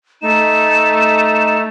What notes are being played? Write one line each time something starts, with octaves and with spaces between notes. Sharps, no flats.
A3 D#4 E7